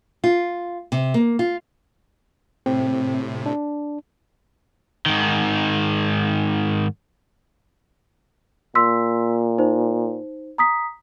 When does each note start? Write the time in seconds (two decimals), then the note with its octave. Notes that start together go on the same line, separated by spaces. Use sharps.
0.24 F4
0.92 C3
1.14 A#3
1.39 F4
2.66 A2 C3 C4
3.46 D4
5.06 G#2 D#3
8.75 A#2 C6 E6 B6
9.58 D#4 C5
10.58 A#5 D#6 B6